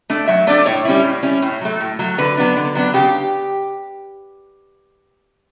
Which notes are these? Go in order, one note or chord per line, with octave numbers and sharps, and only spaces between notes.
A3 D4
F#3 E5
A3 D4 D5
A2 C#5
G3 C#4 E4
A2
G3 C#4 E4
A2
F#3 A3
A2
F#3 A3
D3 B4
F#3 B3 D4
D3
F#3 B3 D4
C#3 G4